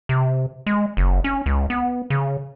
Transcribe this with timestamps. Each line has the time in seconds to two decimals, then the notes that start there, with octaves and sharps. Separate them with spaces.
0.09 C3
0.67 G#3
0.97 F#1
1.24 C#4
1.46 C#2
1.70 B3
2.10 C#3